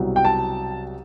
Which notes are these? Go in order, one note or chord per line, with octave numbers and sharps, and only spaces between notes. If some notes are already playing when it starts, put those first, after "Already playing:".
Already playing: C2 B2 F#3
G5
A5